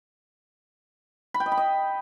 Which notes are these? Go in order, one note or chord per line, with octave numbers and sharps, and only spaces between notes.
B5
G5
D#5
B5
D#5